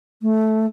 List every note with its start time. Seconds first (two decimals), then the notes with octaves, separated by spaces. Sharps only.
0.22 A3